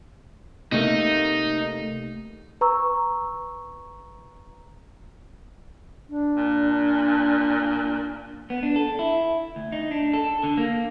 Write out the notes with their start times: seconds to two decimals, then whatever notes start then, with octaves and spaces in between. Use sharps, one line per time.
0.72 C3 A3 A#3 D#4
2.61 B4 A#5 C#6 E6
6.09 D4
6.36 A#2
8.50 B3
8.63 D4
8.76 A4
8.99 E4
9.56 D2
9.72 D#4
9.91 D4
10.13 A4
10.44 D3
10.57 A#3